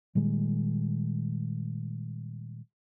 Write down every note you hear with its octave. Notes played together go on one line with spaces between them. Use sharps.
A#2 D#3 G3 G#3